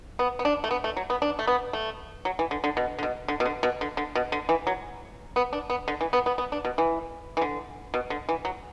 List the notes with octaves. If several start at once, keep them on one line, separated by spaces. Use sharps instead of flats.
B3
B3
D4
A3
B3
A3
F#3
B3
D4
A3
B3
A3
F#3
E3
D3
D3
B2
D3
B2
D3
B2
D3
B2
D3
D3
B2
D3
E3
F#3
B3
D4
B3
D3
E3
B3
B3
B3
D4
B2
E3
E3
D3
B2
D3
E3
F#3